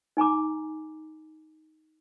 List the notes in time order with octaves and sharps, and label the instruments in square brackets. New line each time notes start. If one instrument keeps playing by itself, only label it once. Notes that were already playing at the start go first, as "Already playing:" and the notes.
[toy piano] D#4 G#5 A#5 D6